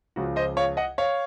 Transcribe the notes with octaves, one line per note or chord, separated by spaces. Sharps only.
C#2 C#3 F3 F#4
C5 D#5
C#5 F5
D#5 F#5
C#5 F5